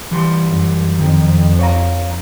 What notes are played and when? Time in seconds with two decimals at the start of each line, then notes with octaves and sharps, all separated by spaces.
0.11 E3 G3 C6
0.49 F#2
0.99 F2 D#3
1.59 C#5 F5 A#5